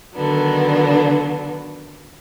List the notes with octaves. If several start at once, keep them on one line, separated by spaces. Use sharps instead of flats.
D3 D#3 F#3 B3 D4